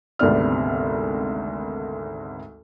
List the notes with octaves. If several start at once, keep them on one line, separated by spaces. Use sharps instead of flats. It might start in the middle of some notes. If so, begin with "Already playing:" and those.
G#1 D2 C3 B3 D5 F6